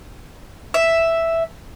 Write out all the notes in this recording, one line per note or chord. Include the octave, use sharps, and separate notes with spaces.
E5